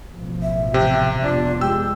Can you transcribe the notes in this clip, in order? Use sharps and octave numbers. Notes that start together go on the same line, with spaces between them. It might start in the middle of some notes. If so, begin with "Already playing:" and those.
A1 B2 F3
E5
C3 G4
F1 B3 D4 F4
G#3 G4 E6